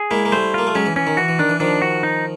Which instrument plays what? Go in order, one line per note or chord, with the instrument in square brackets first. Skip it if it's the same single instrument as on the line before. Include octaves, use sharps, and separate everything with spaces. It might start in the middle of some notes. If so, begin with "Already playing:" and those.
Already playing: [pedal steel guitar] G#4
[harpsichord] G#3 A#3 [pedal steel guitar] E4
[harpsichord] A#3
[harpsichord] G3 A3 [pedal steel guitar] C5
[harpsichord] A#3 [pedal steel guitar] F4
[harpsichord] A3
[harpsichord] F#3 G#3 [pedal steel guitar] C#4
[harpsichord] E3
[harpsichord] E3 [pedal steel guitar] C#4
[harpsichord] D#3
[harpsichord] E3 [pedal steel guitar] F#4
[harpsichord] E3
[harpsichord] D#3 [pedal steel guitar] D4
[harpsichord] E3
[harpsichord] D#3 F3 [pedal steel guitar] D4
[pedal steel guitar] F#4
D#4